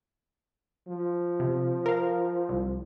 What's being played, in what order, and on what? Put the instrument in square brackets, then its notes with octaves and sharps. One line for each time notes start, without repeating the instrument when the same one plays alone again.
[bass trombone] F3
[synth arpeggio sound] C3
A#4 F5
C2